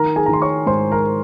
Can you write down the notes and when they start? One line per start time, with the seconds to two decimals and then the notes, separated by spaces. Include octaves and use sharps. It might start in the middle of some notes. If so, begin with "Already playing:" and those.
Already playing: D#3 A#4 A#5
0.16 G#4 G#5
0.26 A#5
0.29 D#3 C6
0.42 C#5 C#6
0.66 G#2 C5 C6
0.92 A#4 A#5